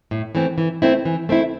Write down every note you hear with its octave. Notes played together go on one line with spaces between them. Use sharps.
A2
E3 A3 C4
E3
A3 C4 E4
E3
A3 C4 E4